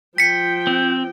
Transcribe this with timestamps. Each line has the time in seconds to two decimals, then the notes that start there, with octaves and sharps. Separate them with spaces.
0.18 F3 G5 B6 C#7
0.67 C4